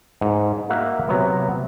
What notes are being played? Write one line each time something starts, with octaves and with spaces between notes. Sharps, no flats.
G#2
A#3 F#4 E5 F#5
C3 F#3 B3